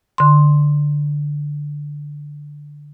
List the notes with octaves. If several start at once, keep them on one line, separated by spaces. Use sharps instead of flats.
D3 C6